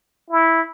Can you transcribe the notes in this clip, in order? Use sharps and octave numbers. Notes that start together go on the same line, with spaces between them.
E4